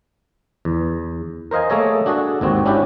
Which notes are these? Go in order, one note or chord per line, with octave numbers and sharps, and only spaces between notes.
E2
A#4 C5 D#5 F5 G#5
A3 A#3 G#4 A4 C#5 D#5
D4 F#4 G#4 A4
G#1 D#2 C4 F#4
C#4 D4 E4 F#4 G4